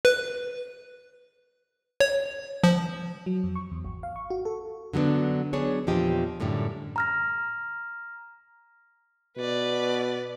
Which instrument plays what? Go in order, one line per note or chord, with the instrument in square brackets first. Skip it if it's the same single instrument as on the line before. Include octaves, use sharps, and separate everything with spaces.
[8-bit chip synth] B4
C#5
F3
[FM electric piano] F#3
F2
C#6
E2
G#1
F5
C#6
F#4
A4
[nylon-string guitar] D3 F#3 G3 B3 D4
F#3 B3 D4 G#4 C#5
E2 A#2 F3 G4 D#5
F#2 A2 D3 G3
[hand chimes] A#5 F6 A#6
[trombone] B2 [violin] B4 D5